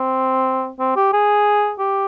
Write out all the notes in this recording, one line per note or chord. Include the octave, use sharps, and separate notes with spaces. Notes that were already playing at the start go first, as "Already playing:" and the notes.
Already playing: C4
C4
G4
G#4
G4